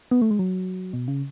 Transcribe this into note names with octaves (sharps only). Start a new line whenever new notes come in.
B3
A3
G#3
F#3
B2
C#3